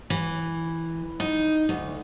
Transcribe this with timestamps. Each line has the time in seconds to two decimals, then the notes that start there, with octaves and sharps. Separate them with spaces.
0.10 E3
1.20 D#4
1.69 D2